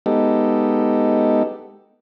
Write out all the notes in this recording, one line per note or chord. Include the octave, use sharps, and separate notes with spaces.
G#3 B3 D#4 G4 A4